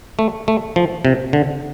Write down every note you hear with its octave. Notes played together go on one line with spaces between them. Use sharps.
A3
A3
F3
C3
D3